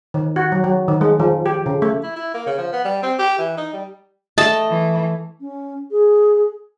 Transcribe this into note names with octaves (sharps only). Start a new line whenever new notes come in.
D#3
F#4
F#3
F#3
D#3
G#3
F3
G4
C#3
A3
E4
E4
A#3
C#3
F3
B3
G3
C4
G4
E3
D#4
G3
A3 D#5 A5
E3
C#4
G#4